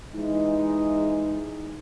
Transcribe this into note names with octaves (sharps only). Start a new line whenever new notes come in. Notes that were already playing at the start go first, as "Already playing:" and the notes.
E3 G#3 D#4